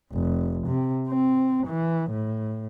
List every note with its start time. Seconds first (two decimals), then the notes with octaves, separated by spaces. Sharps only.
0.12 F1
0.67 C3
1.09 C4
1.67 E3
2.11 A2